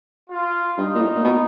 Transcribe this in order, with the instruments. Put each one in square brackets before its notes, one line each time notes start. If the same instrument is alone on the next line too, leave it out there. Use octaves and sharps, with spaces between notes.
[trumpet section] F4
[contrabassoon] G2 [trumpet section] D#4
[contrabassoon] A#2
A2
A#2
B2